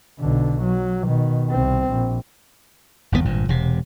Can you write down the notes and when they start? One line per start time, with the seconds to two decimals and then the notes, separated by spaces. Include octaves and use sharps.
0.20 B1 D3
0.62 F#3
1.07 B2 D#3
1.50 C2 C4
1.91 A#1
3.12 G1 E2 C3 B3
3.25 G#1 G2 A#2
3.49 E1 C3